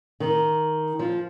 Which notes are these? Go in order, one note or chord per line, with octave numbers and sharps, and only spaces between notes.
D#3
F3